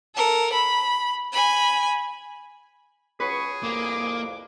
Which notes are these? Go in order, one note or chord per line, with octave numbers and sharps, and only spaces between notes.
A4 A#4
B5
G#5 B5
C#2 F#3 G#4 B4 C#6
C2 F2 A#3 D6